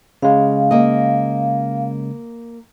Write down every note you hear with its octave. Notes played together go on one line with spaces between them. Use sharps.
C#3 G#3 F5
A#3 D#5